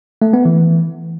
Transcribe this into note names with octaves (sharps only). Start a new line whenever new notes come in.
A3
B3
E3